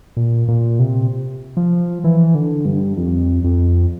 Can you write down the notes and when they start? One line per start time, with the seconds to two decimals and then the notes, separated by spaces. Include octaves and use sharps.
0.17 A#2
0.48 A#2
0.79 C3
1.57 F3
2.04 E3
2.35 D3
2.65 G2
2.97 F2
3.44 F2